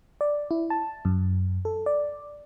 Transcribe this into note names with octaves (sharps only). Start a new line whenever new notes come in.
D5
E4
A5
F#2
A4
D5